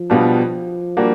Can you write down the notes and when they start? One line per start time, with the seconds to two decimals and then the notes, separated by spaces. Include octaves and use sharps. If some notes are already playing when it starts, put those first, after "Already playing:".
Already playing: F3
0.10 B2 G3 B3 D4 F4
0.97 G3 A#3 D4 F#4